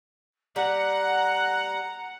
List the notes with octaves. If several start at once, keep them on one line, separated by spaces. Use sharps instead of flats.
G3 F#5 A#5